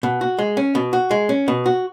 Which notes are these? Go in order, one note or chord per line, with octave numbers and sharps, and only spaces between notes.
B2
F#4
G#3
C#4
B2
F#4
G#3
C#4
B2
F#4